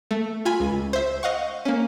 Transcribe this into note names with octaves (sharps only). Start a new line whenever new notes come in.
A3
F4 G#5 B5
C#2
C5 E5
D#5 F5 F#5 C#6
A#3 C#4